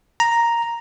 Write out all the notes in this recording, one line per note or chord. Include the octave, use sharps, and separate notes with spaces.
A#5